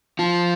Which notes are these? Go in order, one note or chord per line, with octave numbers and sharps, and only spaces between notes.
F3 F4